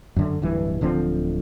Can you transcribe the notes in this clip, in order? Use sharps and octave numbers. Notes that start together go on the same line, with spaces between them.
F#2 D3
D1 G2 E3
D1 D3 F3 C4